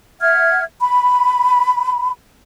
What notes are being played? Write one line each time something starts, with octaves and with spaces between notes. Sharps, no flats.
E5 F#5 F6 G#6
B5